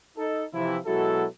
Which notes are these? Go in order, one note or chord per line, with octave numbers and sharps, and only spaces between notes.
D#4 A4
C3 E3 F3 E4
B2 F#3 G#3 E4 F#4 A4